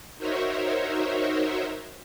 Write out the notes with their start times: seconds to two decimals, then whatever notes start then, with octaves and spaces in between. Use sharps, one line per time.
0.18 D#4 F#4 A#4 C5 C#5 E5